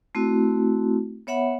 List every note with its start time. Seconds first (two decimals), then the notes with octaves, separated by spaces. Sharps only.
0.15 A3 C4 E4 F#4
1.27 B3 C#5 E5 F#5 B5